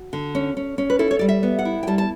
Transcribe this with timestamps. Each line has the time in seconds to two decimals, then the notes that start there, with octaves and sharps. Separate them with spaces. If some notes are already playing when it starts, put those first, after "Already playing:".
Already playing: F#4
0.13 D3
0.35 C#4
0.57 C#4
0.78 C#4
0.90 B4
0.99 E4 A4
1.11 C#5
1.19 G3 D5
1.29 E5
1.43 B3
1.59 F#5
1.65 E4
1.83 G5
1.87 G3 A5
1.98 A5